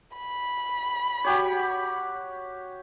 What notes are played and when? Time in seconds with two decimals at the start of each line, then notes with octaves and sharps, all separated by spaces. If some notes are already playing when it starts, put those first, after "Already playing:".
0.16 B5
1.24 F#4 G4 C#5